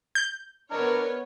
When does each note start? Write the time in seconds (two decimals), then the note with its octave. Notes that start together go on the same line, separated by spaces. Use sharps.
0.15 G6
0.71 B3 D4 A#4 C#5 D#5 A#5 F6